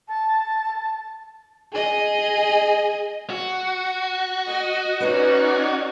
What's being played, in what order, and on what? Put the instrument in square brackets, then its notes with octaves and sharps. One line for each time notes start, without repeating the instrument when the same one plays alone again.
[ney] A5
[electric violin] G#4 D#5
[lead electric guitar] F#4
[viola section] D#5
[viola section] C#4 D#4 D5 [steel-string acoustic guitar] B4 C#5